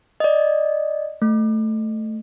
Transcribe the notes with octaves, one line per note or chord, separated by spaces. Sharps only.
D5 D#5
A3